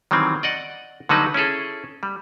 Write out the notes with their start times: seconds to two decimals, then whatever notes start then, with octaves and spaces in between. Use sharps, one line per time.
0.11 D#3 E3 F#3 G3 C4
0.43 D5 D#5 F#5
1.09 D3 F#3 G3 D#4 F#4 B4
1.34 C#4 E4 G#4 A4
2.03 G3